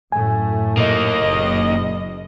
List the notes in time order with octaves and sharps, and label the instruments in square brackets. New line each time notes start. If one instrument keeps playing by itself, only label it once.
[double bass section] F#2 A2 A3 [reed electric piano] G#5
[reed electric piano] A#2 [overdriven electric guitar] A#3 D#4 [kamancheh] D#5
[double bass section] F#1